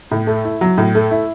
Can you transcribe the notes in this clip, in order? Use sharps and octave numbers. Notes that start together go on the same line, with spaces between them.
A2
A3
E4
F#3
A2
A3
E4